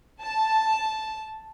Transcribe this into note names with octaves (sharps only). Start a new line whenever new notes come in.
A5